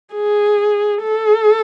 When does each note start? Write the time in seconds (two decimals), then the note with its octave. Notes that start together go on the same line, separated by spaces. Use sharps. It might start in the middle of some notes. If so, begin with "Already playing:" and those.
0.15 G#4
1.03 A4